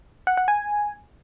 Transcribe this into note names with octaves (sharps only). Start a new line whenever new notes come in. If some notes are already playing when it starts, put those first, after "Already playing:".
F#5
F#5
G#5